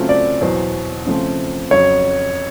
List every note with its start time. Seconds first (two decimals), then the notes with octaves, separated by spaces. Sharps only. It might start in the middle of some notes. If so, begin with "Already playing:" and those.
Already playing: C#3 F#3 A3 C4 F4
0.09 D5
0.41 E2 B2 F#3 C5
1.06 C#3 F3 A3 C4
1.71 F2 C#3 F#3 C#5